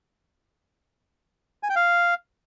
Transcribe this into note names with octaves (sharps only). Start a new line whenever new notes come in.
G#5
G5
F5